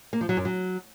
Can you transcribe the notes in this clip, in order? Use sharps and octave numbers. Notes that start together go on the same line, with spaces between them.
A#3
F3
F#3
F#2
F#3